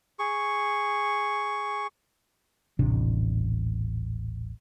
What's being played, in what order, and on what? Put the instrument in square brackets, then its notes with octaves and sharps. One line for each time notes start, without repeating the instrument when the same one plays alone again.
[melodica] G#4 C#6
[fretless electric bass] D#1 A1 C3 D4